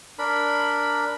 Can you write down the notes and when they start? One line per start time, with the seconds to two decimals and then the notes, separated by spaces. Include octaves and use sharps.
0.19 D4 A#4 B5